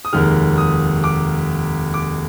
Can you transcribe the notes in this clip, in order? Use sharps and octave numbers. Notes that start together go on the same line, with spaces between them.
D#6
F1 D#2 D#3 G#3 F6
D#6
D6
D6